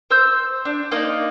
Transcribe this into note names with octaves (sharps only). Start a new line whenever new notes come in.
C5 E6 G6
D4
A#3 D#4 D5